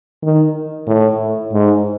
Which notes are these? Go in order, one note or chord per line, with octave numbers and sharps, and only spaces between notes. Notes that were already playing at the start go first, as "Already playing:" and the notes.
D#3
A2
G#2